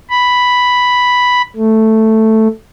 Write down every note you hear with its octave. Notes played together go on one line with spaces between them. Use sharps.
B5
A3